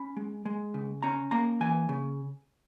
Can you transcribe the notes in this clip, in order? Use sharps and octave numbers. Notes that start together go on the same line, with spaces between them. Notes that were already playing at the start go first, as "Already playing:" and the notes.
Already playing: C#4 B5
G#3
G#3
C#3
C#4 A#5
A#3 A#5
E3 G#5
C#3